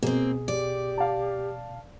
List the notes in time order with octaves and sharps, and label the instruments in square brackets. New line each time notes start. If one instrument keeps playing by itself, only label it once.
[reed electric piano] B2 [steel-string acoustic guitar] A#3 C4 [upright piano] G#4
[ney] G4 [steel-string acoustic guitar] D5
[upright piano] F5 A5